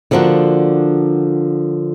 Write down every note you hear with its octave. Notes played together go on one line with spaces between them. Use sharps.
D3 F3 A#3 D4 F#4